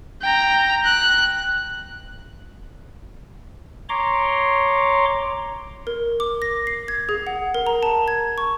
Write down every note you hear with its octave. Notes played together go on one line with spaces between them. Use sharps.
G5 A#5
F#6
C#5 A#5 C6 D6
A#4
D6
A#6
C7
G#6
G#4
F#5
A#4
A#5
A5
G#6
C#6